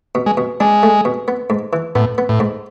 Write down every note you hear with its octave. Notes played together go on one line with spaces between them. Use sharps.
B2
G#3
B2
G#3 D4
A3
B2
B3
G#2
E3
A2 B3
B3
A2
G#2